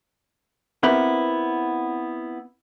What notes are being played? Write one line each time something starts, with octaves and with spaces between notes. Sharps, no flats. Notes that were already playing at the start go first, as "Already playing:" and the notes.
B3 C4 E4 G4 A#4 B4